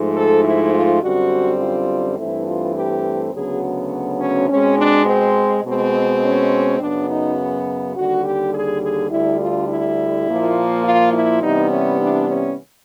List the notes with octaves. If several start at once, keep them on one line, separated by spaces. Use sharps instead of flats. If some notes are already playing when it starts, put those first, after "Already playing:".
Already playing: G#2 F3 A3
A4
E4
F4
F#2 D3 G3 C4 F#4
F4
G2 E3 A3 C4 E4
F4
G4
D2 C#3 F#3 B3 G#4
C#4
B2 G#3 C4 C#4
D4
C4
B2 G#3 C4
C#4
F#2 C#3 F#3 B3 D4
D#4
D#2 D3 G3 F#4
G4
G#4
G#4
D2 D3 G3 E4
F4
E4
A#2 F3 A#3
F4
E4
C3 E3 G3 B3 D#4
C#4
D4
C#4